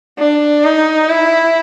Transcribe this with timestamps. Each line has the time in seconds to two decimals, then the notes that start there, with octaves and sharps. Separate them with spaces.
0.18 D4
0.64 D#4
1.10 E4